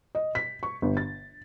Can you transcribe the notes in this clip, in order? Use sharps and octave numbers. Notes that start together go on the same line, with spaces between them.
D#5
B6
C#6
G1
A6